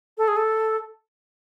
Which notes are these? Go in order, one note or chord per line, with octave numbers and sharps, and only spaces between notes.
A4
G#4
A4